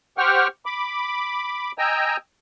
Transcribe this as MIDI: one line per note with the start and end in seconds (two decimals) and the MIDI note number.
0.18 0.47 67
0.18 0.47 72
0.18 0.47 78
0.18 0.47 79
0.18 0.47 85
0.18 0.47 89
0.66 1.72 83
0.66 1.72 86
1.78 2.17 75
1.78 2.17 79
1.78 2.17 80
1.78 2.17 82
1.78 2.17 88